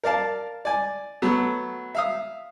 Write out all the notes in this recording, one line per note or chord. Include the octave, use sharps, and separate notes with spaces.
A#4 D5 F5 A5
D5 G#5
F#3 A3 B3
E5 F5 D#6